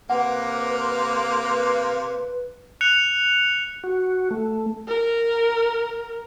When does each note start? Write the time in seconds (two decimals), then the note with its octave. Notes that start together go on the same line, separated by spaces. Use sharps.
0.10 C3 A#3 B4 F#5
2.81 F#6 C#7 F7
3.84 F#4
4.31 A3
4.88 A#4